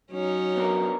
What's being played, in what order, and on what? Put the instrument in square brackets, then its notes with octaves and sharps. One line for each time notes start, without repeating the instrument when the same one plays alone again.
[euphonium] F#3 [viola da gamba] C#4 D#4
[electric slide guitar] B3 D4 A#4